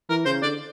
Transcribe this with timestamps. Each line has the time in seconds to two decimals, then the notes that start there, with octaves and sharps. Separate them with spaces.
0.10 E3 A#4
0.25 C#3 C5
0.43 D3 D5